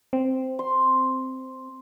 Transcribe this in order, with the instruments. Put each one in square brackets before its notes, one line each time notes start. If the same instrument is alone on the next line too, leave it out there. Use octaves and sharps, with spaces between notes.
[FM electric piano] C4
[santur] C6